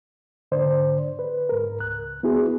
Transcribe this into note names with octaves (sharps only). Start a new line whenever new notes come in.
G#2 D3 C5 D5
B4
G#2 A#4
C#2 F#6
B3 E4 F#4 G#4